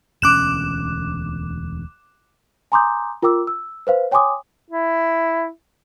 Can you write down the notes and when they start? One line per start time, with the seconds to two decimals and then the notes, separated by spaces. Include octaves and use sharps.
0.22 E1 D2 C#4 D6 F#6 E7
2.72 G#5 A#5 C6 D6 D#6 G6
3.22 F4 A#4 G5 D6 E6
3.47 E6
3.87 B4 C5 F5
4.11 C#5 G5 G#5 C6 D6 D#6
4.70 E4